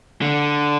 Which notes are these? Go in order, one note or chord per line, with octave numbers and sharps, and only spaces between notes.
D3